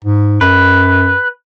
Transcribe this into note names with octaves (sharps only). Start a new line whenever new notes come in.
G#2
F#2 B4